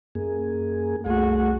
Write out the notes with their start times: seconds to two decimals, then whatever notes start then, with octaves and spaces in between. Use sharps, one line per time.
0.15 F#2 A#3 G#4
1.06 C2 A3 F#4 G#4